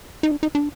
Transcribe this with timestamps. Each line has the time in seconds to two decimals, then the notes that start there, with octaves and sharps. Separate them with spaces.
0.23 D#4
0.31 D4
0.43 D#4
0.55 D4